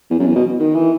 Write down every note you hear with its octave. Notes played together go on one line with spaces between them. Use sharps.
E2
F#2
E2
B2
D#3
E3